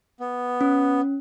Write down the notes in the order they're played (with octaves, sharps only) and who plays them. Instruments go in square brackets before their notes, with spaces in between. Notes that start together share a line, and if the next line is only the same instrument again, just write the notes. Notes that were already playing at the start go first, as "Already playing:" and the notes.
[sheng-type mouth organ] B3
[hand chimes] C#4